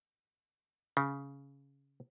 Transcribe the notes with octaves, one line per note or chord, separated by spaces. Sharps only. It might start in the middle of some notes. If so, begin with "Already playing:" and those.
C#3